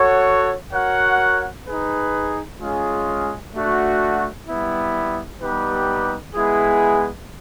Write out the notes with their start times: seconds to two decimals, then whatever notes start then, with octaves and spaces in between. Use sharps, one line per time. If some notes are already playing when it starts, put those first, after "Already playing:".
Already playing: F#4 A4 C#5 F#5
0.73 F#4 A#4 C#5 F#5
1.67 D#4 G#4 B4
2.60 G#3 C#4 F4 G#4
3.54 A3 D4 F#4
4.47 G3 B3 E4
5.41 G3 B3 D#4 G4 B4
6.35 G#3 B3 E4 G#4